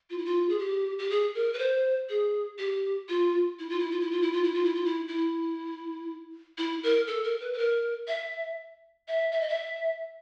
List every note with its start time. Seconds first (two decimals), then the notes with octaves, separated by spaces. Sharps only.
0.10 F4
0.18 E4
0.25 F4
0.49 G#4
0.59 G4
0.99 G4
1.10 G#4
1.35 A#4
1.54 B4
1.59 C5
2.09 G#4
2.58 G4
3.09 F4
3.59 E4
3.70 F4
3.79 E4
3.91 F4
4.00 E4
4.11 F4
4.22 E4
4.33 F4
4.44 E4
4.54 F4
4.64 E4
4.75 F4
4.85 E4
5.08 E4
6.58 E4
6.83 A#4
7.08 A4
7.24 A#4
7.41 B4
7.53 B4
7.58 A#4
8.08 E5
9.08 E5
9.32 E5
9.41 D#5
9.48 E5